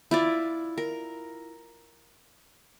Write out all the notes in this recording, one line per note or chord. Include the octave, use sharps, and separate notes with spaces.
E4 F4 D5
A#4